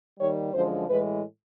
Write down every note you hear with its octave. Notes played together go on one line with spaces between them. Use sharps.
D#2 D#3 G3 C#5
F#2 D3 F3 G#3 C5
A2 E3 G#3 B4